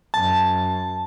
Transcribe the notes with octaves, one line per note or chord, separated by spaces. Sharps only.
F#2 A5